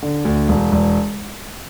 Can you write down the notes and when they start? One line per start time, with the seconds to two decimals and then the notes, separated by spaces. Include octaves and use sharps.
0.02 D3
0.25 D2
0.49 E1
0.72 E1